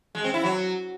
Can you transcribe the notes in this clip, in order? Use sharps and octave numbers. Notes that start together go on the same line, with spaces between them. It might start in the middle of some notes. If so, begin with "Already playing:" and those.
G#3
C4
E4
F#3